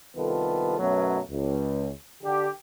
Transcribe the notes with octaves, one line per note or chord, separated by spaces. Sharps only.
C2 D#3 B3 F4 A4
F#2 B2 F#3 A3 B3 C#4
C#2
D3 G4